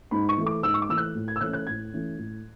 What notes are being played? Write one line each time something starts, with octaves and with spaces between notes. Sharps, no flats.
G#2 B5
C#6
E3 A3
D6
G#2 E6
C#6
D6
E3 A3 E6
F#6
A2
G#6
E6
E3 A3 C#4 F#6
F#6
A2 G#6
E3 A3 C#4
A2